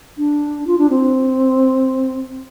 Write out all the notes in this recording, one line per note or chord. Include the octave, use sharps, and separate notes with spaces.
D4
F4
D4
C4